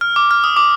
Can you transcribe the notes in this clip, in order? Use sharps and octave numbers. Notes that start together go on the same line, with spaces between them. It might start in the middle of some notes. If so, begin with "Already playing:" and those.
F6
D6
F6
D#6
D6